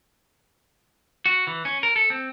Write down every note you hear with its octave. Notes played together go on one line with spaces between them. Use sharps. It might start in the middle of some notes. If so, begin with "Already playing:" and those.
F#4
E3
C#4
A#4
A4
C4